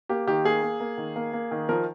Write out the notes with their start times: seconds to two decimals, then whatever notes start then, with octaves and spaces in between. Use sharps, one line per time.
0.09 A#3 G4
0.27 D#3 G4
0.45 A#3 G#4
0.63 A#3
0.80 A#3
0.98 D#3
1.16 A#3
1.33 A#3
1.51 D#3
1.69 F3 A#4